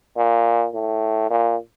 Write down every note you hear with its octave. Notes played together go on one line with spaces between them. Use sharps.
A#2
A2
A#2